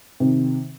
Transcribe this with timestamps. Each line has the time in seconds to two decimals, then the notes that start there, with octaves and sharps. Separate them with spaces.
0.20 C3 D#3